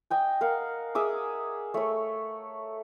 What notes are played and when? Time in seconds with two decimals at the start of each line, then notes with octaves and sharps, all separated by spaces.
0.10 D#5 G5 G#5
0.41 A#4 F5 F#5
0.95 G#4 E5 D6
1.74 A3 C#5